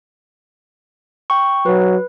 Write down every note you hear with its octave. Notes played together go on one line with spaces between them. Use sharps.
G5 C#6
F#3 B4